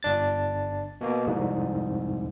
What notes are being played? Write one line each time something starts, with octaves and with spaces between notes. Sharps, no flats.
G1 D4 A6
B2 A#3
C2 F2 G#2